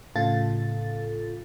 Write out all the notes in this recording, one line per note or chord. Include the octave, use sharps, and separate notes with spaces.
A2 C#3 F4 A4 A6